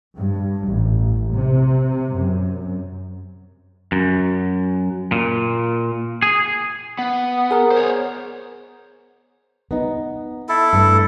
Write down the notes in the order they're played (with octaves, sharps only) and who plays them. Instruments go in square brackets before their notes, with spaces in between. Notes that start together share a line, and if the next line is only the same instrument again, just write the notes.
[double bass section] G2
A1
C3
F#2
[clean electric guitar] F#2
A#2
G#4
[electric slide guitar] B3
[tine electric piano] G#4 A#4
[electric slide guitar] C5 C#5
[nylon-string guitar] B3 D#4
[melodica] E4 A4
[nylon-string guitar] G2 A3